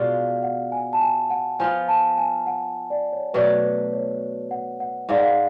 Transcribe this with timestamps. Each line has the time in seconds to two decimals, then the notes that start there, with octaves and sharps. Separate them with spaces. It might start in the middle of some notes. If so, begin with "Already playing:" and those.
Already playing: B2 G#3 D4 F4 F5
0.13 F5
0.43 F#5
0.72 G#5
0.93 A5
1.01 G#5
1.30 F#5
1.59 F3 B3 F4 G#5
1.88 A5
2.18 G#5
2.46 F#5
2.90 D5
3.13 C#5
3.34 B2 F#3 A3 D4 B4
3.63 B4
3.93 C#5
4.51 F#5
4.80 F#5
5.09 G#2 G#3 D4 F5
5.16 F#5
5.24 F5